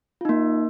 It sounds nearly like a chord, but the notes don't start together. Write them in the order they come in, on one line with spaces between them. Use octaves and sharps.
F4 D#4 A#3